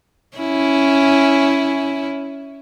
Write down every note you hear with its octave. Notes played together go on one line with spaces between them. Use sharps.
C#4 E4